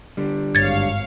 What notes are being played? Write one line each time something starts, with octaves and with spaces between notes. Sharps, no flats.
D3 G3
G#1 G2 C#5 F5 G#6 A6 C#7